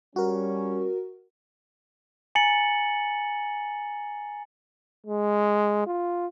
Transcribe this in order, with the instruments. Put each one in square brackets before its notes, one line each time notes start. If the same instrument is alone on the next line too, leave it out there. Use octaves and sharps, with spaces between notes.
[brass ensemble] G3 C#4 [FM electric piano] F#4 A#4
[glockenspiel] G#5 A#5 A6 C#7 F#7
[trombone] G#3
F4